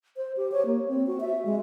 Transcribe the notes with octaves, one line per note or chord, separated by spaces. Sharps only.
C5
G4
C#5
A#3
C4
F#4
E5
G#3